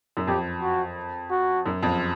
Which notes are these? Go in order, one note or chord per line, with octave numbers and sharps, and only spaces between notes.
F#2
F2 G4
F#4
F#4
F#2
F2